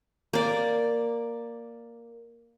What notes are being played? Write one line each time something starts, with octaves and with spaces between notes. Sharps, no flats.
A#3 D5